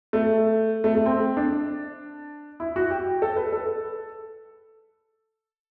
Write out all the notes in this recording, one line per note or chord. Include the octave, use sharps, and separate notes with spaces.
A3
A3
A3
C4
D4
E4
F#4
G4
A4
B4
A4